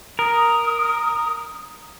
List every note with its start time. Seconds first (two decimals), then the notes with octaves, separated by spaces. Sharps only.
0.19 A#4 D#6